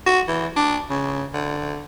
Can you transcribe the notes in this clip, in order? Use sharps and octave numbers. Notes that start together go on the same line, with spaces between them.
F#4
E3
D4
C#3
D3